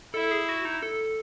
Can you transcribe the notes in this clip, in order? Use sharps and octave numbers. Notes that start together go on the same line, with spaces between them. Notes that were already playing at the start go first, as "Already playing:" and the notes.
E4 A4
G#4
F#4
D#4
A4